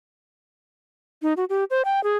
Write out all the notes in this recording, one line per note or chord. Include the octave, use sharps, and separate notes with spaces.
D#4
F#4
G4
C5
G5
G#4